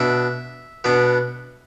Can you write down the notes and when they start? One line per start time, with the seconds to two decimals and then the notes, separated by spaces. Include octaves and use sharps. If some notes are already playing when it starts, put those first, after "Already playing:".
Already playing: B2 D4 E5
0.84 B2 B3 D4